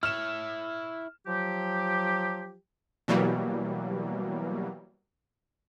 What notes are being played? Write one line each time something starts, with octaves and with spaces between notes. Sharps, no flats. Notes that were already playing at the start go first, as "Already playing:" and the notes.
E4 C#5 F6 E7
F3 F#3 G4
B2 E3 F#3 G3 A#3